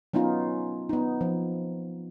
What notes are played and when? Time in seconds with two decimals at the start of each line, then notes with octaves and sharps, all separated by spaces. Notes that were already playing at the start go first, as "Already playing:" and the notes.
0.13 F#3 B3 C#4 D#4 F4
0.89 B3 D#4
1.21 F3